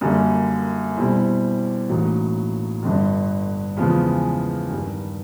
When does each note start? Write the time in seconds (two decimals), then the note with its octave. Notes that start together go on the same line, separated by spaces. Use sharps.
0.01 F#2 D3 G3 A#3
0.96 B2 G3 C4 E4 A4
1.89 A1 A2 F#3 A#3 D#4
2.83 G1 G2 D3
3.77 E2 C#3 F3 G#3 B3
4.70 G2 D#3 G3